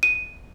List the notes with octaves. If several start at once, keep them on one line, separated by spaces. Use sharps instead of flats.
D#7